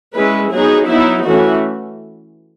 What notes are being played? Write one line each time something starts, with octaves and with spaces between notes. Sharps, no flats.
G#3 C#4 E4 B4
F#3 B3 D#4 G#4
F#3 B3 D#4 E4
E3 A3 C#4 F#4